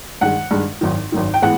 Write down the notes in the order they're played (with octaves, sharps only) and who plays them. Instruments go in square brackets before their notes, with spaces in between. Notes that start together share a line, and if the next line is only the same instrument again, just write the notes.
[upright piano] G2 D#3 G#3 F#5
G2 D#3 G#3
G#1 F#2 D#3
G#1 F#2 D#3
G5
A2 E3 G#3 B3 F#5